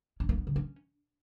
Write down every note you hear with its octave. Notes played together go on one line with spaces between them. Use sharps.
C#4
A#3
B3
C#3
C#4